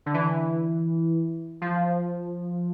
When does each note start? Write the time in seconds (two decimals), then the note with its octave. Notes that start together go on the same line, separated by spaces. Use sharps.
0.06 D3
0.14 E3
1.61 F3